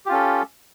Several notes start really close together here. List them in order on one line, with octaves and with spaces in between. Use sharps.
G4 F4 C#4 A4